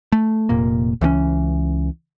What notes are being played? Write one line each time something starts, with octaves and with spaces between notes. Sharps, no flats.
A3
F1 A#2 A#3
C#2 E3 C4 C#4